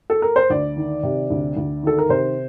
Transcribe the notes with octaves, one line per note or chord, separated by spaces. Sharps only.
A4
A#4
C5
D2 D5
D#3
C3
D2
D2
D#3 A4
A#4
C3 C5